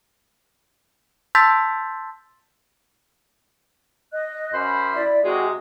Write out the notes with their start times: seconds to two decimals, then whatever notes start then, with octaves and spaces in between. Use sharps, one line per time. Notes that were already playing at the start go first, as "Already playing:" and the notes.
1.35 A5 C6 E6 G6 A6 B6
4.12 D#5 F#6
4.53 F#2 C5 B5
4.93 E4 D5 E5
5.24 C3 G#3 F#4 G#4